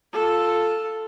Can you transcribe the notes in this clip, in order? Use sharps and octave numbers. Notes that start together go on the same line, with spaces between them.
F4 A4